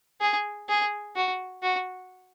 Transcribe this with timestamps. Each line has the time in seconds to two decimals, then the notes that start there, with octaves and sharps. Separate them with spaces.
0.21 G#4
0.69 G#4
1.16 F#4
1.63 F#4